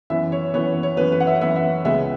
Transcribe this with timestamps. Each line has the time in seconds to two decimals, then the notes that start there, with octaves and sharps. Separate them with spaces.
0.10 F#2 E3 B3 E5
0.32 C#5
0.54 F#2 E3 B3 C#5
0.83 C#5
0.97 F#2 E3 B3 B4
1.12 B4
1.20 F#5
1.27 E5
1.41 F#2 E3 B3 E5
1.56 E5
1.85 C#2 C#3 G#3 B3 E5